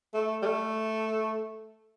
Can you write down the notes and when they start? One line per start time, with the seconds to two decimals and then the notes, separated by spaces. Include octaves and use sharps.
0.14 A3
0.42 G3
0.46 A3